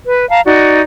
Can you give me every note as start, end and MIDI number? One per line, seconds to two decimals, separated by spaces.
0.06 0.28 71
0.29 0.41 77
0.29 0.41 81
0.29 0.41 82
0.45 0.81 63
0.45 0.81 66
0.45 0.81 74